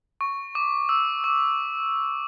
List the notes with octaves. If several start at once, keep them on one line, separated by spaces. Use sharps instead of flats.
C#6
D6
E6
D6